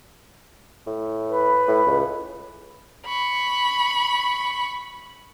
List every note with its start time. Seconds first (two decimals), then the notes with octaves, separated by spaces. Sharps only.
0.86 A2
1.29 B4
1.68 A2
1.87 C#2
3.05 B5 C#6